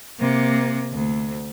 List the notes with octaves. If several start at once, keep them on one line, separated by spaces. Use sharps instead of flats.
C3 A#3
D2